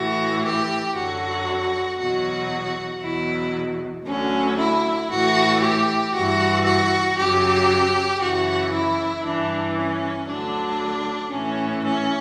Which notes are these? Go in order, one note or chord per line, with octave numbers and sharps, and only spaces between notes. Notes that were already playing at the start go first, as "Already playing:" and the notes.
Already playing: A2 E3 F#4
G4
F#2 D3 F#3 F#4
E2 B2 F#3 F#4
E2 B2 F#3 E4
D2 D3 F#3 C#4
E4
A2 E3 F#4
G4
G2 E3 F#4
F#4
F#2 C#3 F#3 G4
F#2 C#3 E3 F#4
E4
G2 E3 D4
C#4
D2 D3 F#3 D4
A2 E3 C#4
C#4